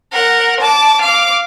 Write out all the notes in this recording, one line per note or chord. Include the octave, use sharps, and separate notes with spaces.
A#4 F#5
A5 D6
F5 D6